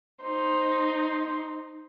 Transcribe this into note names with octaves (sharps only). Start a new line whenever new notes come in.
D#4 C5